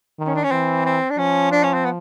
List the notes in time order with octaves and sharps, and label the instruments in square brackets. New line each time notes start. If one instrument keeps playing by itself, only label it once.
[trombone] D#3
[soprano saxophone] C#4
D4
C#4
[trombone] E3 [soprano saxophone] C4
[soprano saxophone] C4
D4
[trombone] F3 [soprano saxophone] C#4
[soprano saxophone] D4
C#4
C4
B3